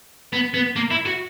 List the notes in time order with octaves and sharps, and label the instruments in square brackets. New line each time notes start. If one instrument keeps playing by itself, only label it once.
[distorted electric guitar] B3
B3
A#3
E4
F#4